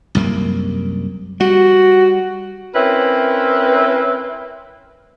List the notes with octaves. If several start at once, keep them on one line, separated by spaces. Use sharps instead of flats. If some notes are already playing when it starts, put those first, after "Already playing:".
C2 F#2 A#3
G3 F#4
C4 C#4 E4 A#4 B4